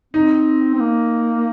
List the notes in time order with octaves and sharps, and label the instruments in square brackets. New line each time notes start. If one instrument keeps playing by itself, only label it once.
[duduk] C4 [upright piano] D#4
[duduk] C4
A#3